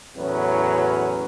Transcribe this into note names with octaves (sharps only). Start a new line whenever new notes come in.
E2 A2 F#3 C#4 B4